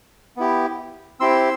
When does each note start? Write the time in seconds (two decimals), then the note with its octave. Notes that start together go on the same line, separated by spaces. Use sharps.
0.37 B3 E4 G4
1.20 C4 E4 G4 C6 E6